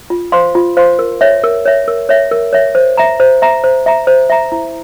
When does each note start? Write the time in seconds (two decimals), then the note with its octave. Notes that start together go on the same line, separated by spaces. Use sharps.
0.10 F4
0.32 C5 F5 C6
0.55 F4
0.77 C5 F5 C6
0.99 A#4
1.21 C#5 E5
1.44 A#4
1.65 C#5 E5
1.88 A#4
2.09 C#5 E5
2.31 A#4
2.53 C#5 E5
2.75 C5
2.97 E5 A#5
3.20 C5
3.42 E5 A#5
3.64 C5
3.86 E5 A#5
4.07 C5
4.30 E5 A#5
4.52 E4